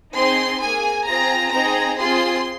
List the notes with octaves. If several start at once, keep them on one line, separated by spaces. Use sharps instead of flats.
C4 D#4 G#4 C6
A#3 G#4 G#5
C4 F4 G#4 A#5
C4 D#4 G#4 A#5
C4 F4 G#4 C6